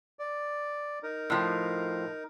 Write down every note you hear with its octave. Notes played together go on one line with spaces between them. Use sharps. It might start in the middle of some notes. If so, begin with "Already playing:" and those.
D5
D#4 A#4
A2 F3